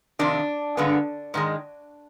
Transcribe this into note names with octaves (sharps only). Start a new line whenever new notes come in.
F2 C3 D#3 D4
G2 D3 G#3 B3
G#2 D#3 G#3